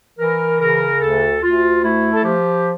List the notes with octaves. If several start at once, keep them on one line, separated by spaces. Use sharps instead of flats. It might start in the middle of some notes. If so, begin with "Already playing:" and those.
E3 A#4
C#3 A#4
D2 A4
D2 F4
A3 E4
A4
F3 G4